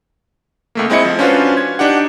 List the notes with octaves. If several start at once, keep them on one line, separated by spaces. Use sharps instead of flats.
C#2 A3 A#3
G#3 C4 E4 D#5 C#7
F3
C#4 D4 F4 F#4 B4 C5
G#6
D4 D#4 G4 F#5